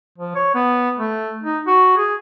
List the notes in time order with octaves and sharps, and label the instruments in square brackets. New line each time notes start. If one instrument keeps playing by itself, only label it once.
[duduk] F3
C#5
B3
A3
D#4
F#4
G#4